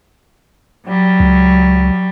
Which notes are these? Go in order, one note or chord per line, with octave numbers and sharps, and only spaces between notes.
F#3 G3
C#2